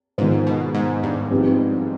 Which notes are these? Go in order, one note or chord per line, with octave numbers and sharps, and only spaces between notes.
G#2 D#3 B3 F4 C5
B2
G#2
G2
F3 C4 D#4 G4 B4